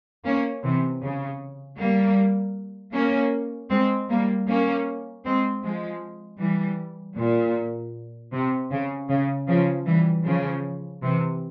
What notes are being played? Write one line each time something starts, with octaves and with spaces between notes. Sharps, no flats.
A#3 C#4
C3 E3
C#3
G3 A#3
A#3 C#4
G#3 C4
G3 A#3
A#3 C#4
G#3 C4
F3 G#3
E3 G3
A#2
C3
C#3
C#3
C#3 F3
E3 G3
C#3 F3
C3 E3